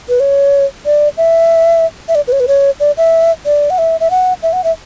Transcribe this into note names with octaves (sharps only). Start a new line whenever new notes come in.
B4
C#5
D5
E5
E5
D5
B4
C#5
B4
C#5
D5
E5
D5
F#5
E5
E5
F#5
E5
F#5
E5